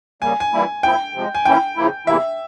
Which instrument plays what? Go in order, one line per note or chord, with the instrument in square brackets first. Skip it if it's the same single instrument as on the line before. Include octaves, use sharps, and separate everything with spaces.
[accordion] C#3 G3 A#3 [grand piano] G#5
[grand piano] G#5
[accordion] E3 G3 A#3 E4
[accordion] A#2 F3 C4 E4 [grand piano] G5
[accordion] C3 F3 G#3
[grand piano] G#5
[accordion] E3 A#3 C#4 E4 [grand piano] G5
[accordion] C#3 F3 A#3 E4
[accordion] E2 C3 E3 A#3 E4 [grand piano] E5